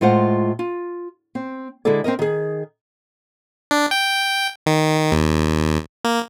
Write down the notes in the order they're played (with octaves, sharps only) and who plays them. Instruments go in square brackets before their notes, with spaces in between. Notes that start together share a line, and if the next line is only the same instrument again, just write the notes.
[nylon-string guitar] A2 G#3 F4 C5 F#5
F4
C4
D3 G#3 E4 G#4 A4 D5
C4 C#4 A#4 D#5
D#3 G#4
[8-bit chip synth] D4
G5
D#3
D#2
A#3